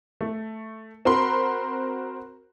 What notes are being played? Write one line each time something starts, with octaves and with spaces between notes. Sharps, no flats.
A3
C4 F#4 A#4 B5 C6